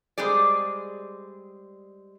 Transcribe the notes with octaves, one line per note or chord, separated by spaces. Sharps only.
G3 G#3 C4 G#4 D5